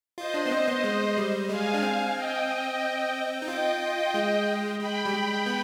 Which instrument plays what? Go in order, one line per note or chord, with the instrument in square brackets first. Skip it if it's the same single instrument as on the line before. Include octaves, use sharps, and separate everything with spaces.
[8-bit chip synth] F4 [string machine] C5 D#5
[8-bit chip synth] D4
B3
C4
B3
G#3
G3
[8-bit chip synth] G#3 [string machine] F5 G#5
[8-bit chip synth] D4
C4
[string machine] D#5 G5
[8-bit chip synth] D#4
[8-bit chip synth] F4 [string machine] D#5 G5
[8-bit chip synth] G#3
[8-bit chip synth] G#3 [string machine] G5 B5
[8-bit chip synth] G3
G#3
B3